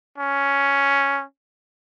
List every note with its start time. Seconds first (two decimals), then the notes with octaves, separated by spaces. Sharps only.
0.18 C#4